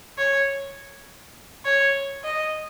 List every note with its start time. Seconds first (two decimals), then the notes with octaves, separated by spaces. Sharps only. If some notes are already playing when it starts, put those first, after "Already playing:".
0.18 C#5
1.65 C#5
2.24 D#5